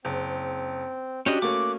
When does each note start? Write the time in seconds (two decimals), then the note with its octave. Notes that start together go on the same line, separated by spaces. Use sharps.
0.05 F#1 C4
1.26 C#4 D4 F#4 G4 D#5 F#6
1.42 A3 A#3 C#4 D6